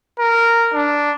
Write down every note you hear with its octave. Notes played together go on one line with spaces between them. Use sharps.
A#4
D4